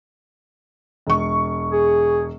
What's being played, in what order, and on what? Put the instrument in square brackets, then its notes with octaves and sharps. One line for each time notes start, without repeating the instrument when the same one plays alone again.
[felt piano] E1 C#6
[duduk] G#4